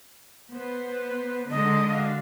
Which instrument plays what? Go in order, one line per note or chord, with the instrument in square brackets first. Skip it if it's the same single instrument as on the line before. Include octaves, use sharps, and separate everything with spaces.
[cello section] B3 [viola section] B4 C5
[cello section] D3 G#3 [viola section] D4 D#4 C6 [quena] D#5
[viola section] D4 F#4 F5